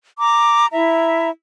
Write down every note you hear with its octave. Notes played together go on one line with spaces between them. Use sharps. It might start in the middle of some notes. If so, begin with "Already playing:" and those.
A#5 D6
E4 E5 A#5